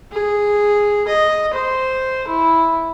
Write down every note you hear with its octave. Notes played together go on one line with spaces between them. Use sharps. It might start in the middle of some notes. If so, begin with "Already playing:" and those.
G#4
D#5
C5
E4